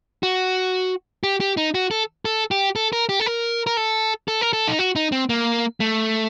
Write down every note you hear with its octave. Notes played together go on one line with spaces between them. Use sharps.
F#4
G4
G4
D#4
F#4
A4
A4
G4
A4
A#4
G4
A4
A#4
A#4
A4
A4
A#4
A4
D#4
F#4
D#4
C4
A#3
A3